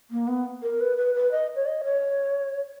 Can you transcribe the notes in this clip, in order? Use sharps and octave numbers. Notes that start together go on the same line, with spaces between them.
A#3
B3
A#4
B4
B4
B4
D#5
C#5
D#5
C#5